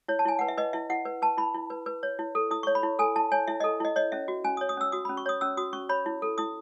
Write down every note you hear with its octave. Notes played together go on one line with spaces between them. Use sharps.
E4 C#5
A5
E4 G#5
B4 F#5
E5
B4 D#5
E4 E5
E4 F#5
B4
B4 A5
E4 B5
E4
B4
B4
C#5
E4
A4
E4 D#6
C#6
C#5
B5
E4
A4 G#5
E4 A5
C#5 G#5
E4 E5
A4 D#5
E4 D#5
C#5 D#5
C#4 E5
F#4
C#4 G#5
D#6
C#5
D#6
C#4 E6
F#4 D#6
B5
C#4
C#6
C#5 D#6
C#4 E6
F#4 D#6
C#4 C#6
C#5 B5
E4
A4
E4 D#6